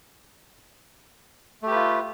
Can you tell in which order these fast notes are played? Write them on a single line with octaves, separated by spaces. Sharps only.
A3 G4 B4 F4